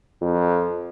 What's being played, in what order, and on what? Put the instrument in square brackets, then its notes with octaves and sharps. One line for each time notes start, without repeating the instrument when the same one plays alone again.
[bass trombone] F2